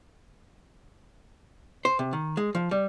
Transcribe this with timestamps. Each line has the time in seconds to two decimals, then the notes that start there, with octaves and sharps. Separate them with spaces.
1.85 C5
1.99 C3
2.13 D#3
2.37 G#3
2.55 F3
2.71 G3